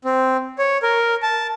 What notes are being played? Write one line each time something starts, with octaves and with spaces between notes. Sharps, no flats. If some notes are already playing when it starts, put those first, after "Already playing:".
C4
C#5
A#4
A5